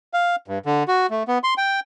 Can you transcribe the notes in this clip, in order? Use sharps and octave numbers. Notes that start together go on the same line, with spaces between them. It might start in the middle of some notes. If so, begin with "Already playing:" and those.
F5
G2
D3
F#4
A3
B3
C6
G5